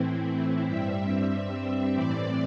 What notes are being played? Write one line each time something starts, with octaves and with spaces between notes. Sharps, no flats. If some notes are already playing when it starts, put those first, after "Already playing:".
Already playing: A2 E3 C4 E4
G2 G3 C4 E5
A2 E3 C4 D5